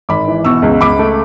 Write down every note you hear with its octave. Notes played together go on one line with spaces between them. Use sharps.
G#1 B5 D6
E3
B2 C#6 E6
C#2
C#2 B5 D6
A3